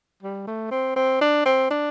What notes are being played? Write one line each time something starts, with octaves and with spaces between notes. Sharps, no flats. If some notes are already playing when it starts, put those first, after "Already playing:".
G3
A3
C4
C4
D4
C4
D4